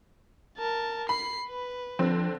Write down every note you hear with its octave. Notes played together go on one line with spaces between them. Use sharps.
A#4 A5
B5 C7
B4
D3 F3 C4